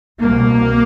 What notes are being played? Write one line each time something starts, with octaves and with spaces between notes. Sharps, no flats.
C2 B2 A#3